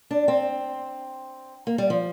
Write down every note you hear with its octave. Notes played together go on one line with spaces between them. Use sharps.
D4
C4
A#3
G3
F3